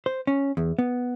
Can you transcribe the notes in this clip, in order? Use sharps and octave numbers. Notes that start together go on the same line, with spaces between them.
C5
C#4
E2
B3